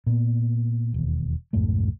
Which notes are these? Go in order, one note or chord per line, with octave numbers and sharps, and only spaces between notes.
A#2 B3
E1 D#2
B1 F2 G#2 A3